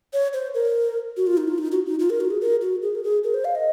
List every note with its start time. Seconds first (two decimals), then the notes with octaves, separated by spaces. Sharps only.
0.13 C#5
0.34 C5
0.54 A#4
1.17 F#4
1.27 F4
1.37 D#4
1.48 F4
1.58 D#4
1.72 F#4
1.86 D#4
1.99 F4
2.10 A#4
2.21 F#4
2.31 G#4
2.41 A#4
2.62 F#4
2.82 G#4
2.95 A#4
3.04 G#4
3.24 A#4
3.34 C5
3.45 F5
3.55 D#5